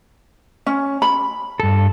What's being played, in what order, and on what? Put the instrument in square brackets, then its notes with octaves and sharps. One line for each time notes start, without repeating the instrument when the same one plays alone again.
[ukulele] C#4
B5
[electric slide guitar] G2 A4